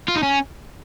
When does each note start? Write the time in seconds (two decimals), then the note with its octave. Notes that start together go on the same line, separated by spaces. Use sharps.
0.08 F4
0.16 D#4
0.23 C#4